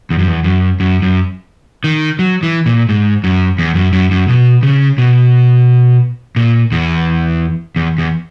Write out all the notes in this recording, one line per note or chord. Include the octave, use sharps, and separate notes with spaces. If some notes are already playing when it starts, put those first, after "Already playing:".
E2
F#2
E2
F#2
F#2
F#2
D#3
F#3
E3
A#2
G#2
F#2
E2
F#2
F#2
F#2
B2
C#3
B2
A#2
E2
E2
E2